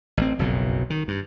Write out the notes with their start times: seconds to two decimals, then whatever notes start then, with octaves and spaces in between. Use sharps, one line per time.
0.17 A1 C4
0.39 F#1 B1 F2 B2
0.90 D#3
1.08 G2